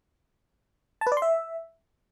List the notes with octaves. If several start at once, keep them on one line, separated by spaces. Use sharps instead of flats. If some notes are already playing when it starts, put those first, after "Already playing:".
A5
B4
D5
C6
E5